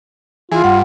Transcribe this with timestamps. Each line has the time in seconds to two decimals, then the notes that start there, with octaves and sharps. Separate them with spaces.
0.52 E3 F4 G#4
0.64 G2 F#5